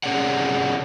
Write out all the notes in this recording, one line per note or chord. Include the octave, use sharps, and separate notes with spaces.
C3 C#4 G#4 C#5 D5 F#5